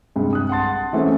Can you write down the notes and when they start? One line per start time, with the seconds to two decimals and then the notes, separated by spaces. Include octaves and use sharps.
0.16 G2 C3 G#3
0.33 D#6 F#6
0.49 F#5 A5 C6 A6
0.93 E3 G#3 A3 C4 C#4